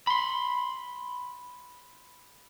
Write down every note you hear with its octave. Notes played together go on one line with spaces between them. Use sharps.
B5 C6